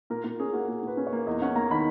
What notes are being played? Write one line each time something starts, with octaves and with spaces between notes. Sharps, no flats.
A#2 A#4
A#2 A#4
C#4 G#4
A#3 F#4
A#2 G#4
A#2 B4
C#4
C#5
A#3
E2 D#5
C#4 F#5
A#3 A#5
D#3 B5